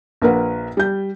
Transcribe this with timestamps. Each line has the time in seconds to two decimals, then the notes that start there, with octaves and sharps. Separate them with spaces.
0.22 A#1 A#3 A#4 B4 F#5
0.77 G3 G6